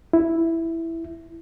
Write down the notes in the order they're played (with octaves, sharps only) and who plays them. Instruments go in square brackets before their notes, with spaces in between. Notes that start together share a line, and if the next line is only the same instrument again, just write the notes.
[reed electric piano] E4